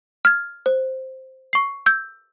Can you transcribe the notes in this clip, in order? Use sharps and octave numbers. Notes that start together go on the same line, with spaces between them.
F6 G#6
C5
C#6 C7
E6 G6